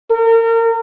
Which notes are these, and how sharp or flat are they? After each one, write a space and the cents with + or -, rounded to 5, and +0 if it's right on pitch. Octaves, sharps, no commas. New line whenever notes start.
A#4 -35